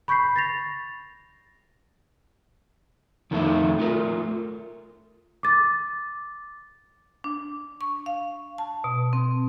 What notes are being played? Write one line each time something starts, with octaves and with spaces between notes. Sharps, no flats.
B5 C#6 G6 B6 C7
A6 A#6 F7
F2 D#3 A3 E4 A4 E5
A3 F4 A#4
D6 A6
D4
C#6
F5
A5
B2
C4